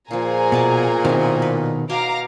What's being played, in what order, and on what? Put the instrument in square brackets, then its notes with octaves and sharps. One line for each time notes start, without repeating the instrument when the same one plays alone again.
[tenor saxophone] A#2 [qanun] F3 F4 [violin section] G#4 G#5 A#5
[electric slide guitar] B2 [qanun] B4 D5 A5
[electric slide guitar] B2 D#3 [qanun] C4 E4
[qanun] B4
[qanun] B2 G#5 C6 [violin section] F5 A#5 D6